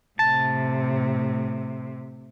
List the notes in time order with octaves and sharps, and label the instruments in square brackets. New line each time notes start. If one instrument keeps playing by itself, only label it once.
[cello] A2 C3 [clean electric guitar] A5